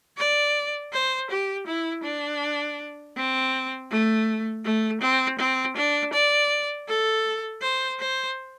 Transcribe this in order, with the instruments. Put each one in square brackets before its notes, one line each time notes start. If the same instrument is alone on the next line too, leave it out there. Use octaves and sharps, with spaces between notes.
[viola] D5
C5
G4
E4
D4
C4
A3
A3
C4
C4
D4
D5
A4
C5
C5